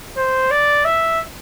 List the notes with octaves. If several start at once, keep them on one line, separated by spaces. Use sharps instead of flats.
C5
D5
E5